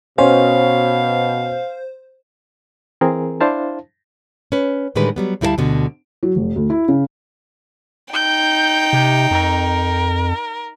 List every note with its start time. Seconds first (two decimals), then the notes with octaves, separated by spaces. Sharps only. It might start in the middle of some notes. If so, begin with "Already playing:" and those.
0.18 B2 C#4 C5 F5
3.01 E3 C4 G#4 A#4
3.41 D4 E4 C5 F5 A5
4.52 C#4 B4
4.95 A2 D3 D#3 G3 G#3 B4
5.16 F#3 G3 B3
5.41 D2 G3 E4 A#4 F5 A5
5.58 D2 B2 D3
6.23 F#3
6.36 F1
6.56 D2
6.70 E4
6.88 C#3
8.13 D#4 G5 G6
8.93 C3
9.31 F2 A#4